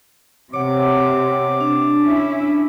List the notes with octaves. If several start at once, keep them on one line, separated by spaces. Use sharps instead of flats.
C3 C#5 F#5 D6
D4
C#4 E4